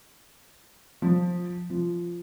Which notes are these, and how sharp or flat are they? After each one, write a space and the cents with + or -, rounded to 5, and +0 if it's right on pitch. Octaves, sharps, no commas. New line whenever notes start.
F3 +15
F3 -10